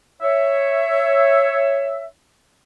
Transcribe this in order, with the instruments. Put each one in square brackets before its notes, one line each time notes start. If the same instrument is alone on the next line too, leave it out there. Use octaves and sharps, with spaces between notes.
[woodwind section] C#5 E5